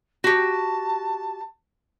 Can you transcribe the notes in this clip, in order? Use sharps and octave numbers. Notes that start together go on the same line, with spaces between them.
F#4 G4 A5